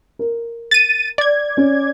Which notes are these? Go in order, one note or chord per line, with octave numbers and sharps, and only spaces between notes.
A#4
A6 D#7
D5 G#6
C#4